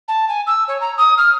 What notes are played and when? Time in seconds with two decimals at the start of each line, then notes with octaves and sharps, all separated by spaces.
0.08 A5
0.28 G#5
0.47 E6
0.68 C#5
0.81 A#5
0.98 D#6
1.18 F6